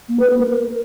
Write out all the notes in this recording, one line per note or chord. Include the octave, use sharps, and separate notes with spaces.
A#3
B4
A#3
A#4